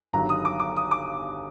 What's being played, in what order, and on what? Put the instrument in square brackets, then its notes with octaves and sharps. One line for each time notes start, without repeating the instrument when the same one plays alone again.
[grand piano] G1 G2 D#3 F#3 A#5
D#6
D6
D6
D#6
D6